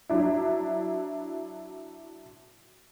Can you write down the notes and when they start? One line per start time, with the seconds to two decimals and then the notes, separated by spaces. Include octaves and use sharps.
0.09 F#3 D4 E4